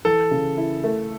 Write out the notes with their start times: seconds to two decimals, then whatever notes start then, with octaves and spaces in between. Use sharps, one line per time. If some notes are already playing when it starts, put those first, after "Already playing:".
0.05 E3 A4
0.31 C#3
0.57 E4
0.84 A3